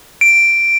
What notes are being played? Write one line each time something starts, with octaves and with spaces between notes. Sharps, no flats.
D7